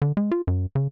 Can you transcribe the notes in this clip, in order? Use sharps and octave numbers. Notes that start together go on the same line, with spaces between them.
D3
G#3
F4
F#2
C#3